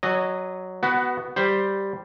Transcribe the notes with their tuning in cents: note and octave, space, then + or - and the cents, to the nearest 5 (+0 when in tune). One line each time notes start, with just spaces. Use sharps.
F#3 +0 D#5 -20 G#5 +0
B3 +0 F#4 +25
G3 +0 C5 +0